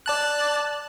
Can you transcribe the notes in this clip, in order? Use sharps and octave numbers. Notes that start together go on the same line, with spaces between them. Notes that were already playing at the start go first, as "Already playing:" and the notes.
D5 A5 F#6